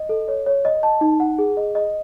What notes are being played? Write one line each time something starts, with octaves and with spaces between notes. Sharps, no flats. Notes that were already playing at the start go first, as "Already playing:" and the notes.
Already playing: D#5
A4
C#5
C#5
D#5
A5
D#4
F#5
G#4
D#5
D#5